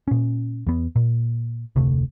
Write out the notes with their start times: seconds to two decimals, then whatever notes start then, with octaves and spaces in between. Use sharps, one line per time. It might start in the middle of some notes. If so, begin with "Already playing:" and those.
0.08 A#2 C#4
0.67 E2 B3
0.96 A#2
1.76 F1 D2 C3 A3